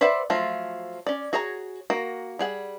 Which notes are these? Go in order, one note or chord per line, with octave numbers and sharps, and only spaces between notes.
B4 C5 D5 E5 F#5
F3 F#3 A3 F4
C#4 D5
F#4 G#4 C#5 G#5 A#5
A#3 F#4
G3 G#4 F#5